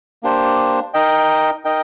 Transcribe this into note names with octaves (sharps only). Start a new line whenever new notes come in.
A#3 D4 G4 C5
D#4 A#4 D#5 G5
D#4 A#4 D#5 G5